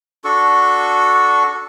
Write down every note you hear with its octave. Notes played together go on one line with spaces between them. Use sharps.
D4 F#4 A4 C#6